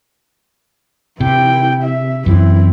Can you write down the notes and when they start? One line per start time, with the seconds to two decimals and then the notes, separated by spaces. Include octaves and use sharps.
1.20 C3 E4 G5
1.84 E5
2.26 F#2 E3 C4 E4